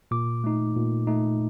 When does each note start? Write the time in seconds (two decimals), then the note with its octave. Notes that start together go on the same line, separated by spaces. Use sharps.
0.11 A#2 D6
0.44 A3 D#4
0.76 A#2
1.07 A3 D#4